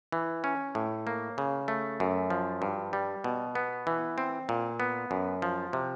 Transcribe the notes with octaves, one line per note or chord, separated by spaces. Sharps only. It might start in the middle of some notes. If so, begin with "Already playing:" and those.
E3
C#4
A2
A#3
C#3
A3
F#2
F3
G2
G3
B2
B3
E3
C4
A#2
B3
F#2
F3
C3